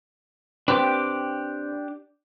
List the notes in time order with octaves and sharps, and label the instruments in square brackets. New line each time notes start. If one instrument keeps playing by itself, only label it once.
[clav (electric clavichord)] C4 B4 [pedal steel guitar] D4 G4 D6